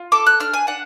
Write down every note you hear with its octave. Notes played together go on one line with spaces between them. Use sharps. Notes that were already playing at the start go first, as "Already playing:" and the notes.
Already playing: F4
A4 D6
F#6
D4 F6
G#5
D4 F#5